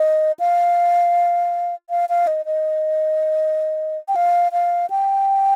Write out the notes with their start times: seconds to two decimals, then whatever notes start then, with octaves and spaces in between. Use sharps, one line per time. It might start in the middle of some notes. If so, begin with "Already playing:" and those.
Already playing: D#5
0.40 F5
1.90 F5
2.09 F5
2.27 D#5
2.46 D#5
4.08 G5
4.16 F5
4.52 F5
4.90 G5